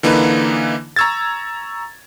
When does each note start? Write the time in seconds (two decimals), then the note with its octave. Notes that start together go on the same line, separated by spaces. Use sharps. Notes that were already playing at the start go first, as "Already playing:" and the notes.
0.03 D3 E3 A#3 D#4 B4
0.96 A#5 C#6 E6 G#6 A6